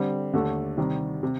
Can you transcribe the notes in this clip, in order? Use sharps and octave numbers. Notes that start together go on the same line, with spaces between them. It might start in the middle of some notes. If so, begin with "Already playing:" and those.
Already playing: D3 G3 C4
D#2 D3 A3 D4 A4
C3 D#3 G3
C3